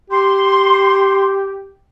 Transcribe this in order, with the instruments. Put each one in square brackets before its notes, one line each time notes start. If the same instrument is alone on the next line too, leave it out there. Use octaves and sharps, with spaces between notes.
[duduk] G4 [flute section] C6